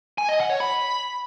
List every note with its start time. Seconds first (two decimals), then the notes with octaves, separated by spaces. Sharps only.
0.18 G#5
0.29 D#5
0.39 F#5
0.50 C#5
0.60 B5